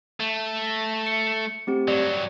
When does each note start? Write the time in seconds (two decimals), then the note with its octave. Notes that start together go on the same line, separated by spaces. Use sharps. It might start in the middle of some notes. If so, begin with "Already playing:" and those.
0.20 A3
0.67 A#6
1.07 C#7
1.67 A3 C4 G4
1.88 G2 F#3 D5 C#7